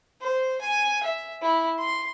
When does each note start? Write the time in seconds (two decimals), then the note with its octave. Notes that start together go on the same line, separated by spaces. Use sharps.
0.21 C5
0.61 G#5
1.03 E5
1.42 E4
1.79 C6